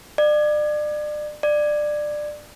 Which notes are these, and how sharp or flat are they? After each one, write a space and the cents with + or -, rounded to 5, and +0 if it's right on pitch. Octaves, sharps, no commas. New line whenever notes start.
D5 +35
D5 +20